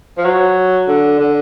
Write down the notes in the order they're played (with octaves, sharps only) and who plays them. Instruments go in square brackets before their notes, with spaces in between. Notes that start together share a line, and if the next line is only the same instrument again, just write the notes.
[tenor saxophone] F3
F#3
D3
D3